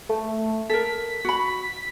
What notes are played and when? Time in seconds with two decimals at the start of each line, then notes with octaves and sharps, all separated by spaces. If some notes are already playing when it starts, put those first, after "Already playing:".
0.09 A3
0.69 A4 A#4 B6
1.25 F#4 B5